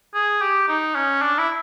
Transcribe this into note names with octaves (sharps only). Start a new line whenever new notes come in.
G#4
G4
D#4
C#4
D4
E4